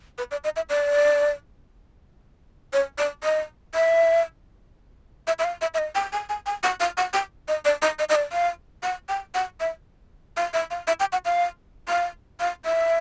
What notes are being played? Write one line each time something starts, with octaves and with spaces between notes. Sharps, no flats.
B4
D5
D#5
E5
D5
C#5
D5
D#5
E5
E5
E5
F5
E5
E5
D#5
G5
G#5
G#5
G#5
F#5
F5
F#5
G5
D#5
D5
D#5
D#5
D#5
D5
F5
F#5
G5
F#5
E5
F5
E5
F5
E5
G5
F#5
F5
F5
F5
E5